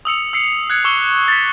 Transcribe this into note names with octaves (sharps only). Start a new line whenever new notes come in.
D#6 E6 C#7 F7
E6 C7 C#7
F#6 G#6 C#7
C#6 D6 E6 C#7 G7
A6 B6